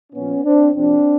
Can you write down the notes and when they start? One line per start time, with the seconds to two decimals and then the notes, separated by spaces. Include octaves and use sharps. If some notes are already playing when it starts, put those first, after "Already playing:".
0.13 A#2 F3 B3 C#4
0.44 C4 D4
0.74 F2 C3 F3 C4 D4